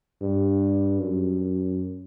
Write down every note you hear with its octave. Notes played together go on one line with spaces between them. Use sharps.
G2
F#2